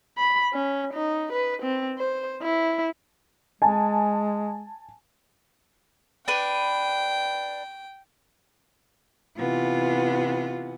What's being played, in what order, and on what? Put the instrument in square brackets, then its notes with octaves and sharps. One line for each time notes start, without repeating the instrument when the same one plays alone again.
[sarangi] B5
C#4
D#4
B4
C4
C5
E4
[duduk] G#3 [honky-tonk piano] G#5 A5
[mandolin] D4 B4 [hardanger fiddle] G5
[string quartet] C3 E3 B3 [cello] F4